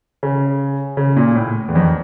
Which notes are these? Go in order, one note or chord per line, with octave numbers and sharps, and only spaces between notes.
C#3
C#3
A#2
A2
E2
F2